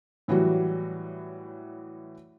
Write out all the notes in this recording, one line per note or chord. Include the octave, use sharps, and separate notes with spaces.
A2 E3 F#3 G3 F#4